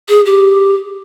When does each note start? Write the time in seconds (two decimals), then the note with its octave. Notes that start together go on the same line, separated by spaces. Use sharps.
0.09 G#4
0.26 G4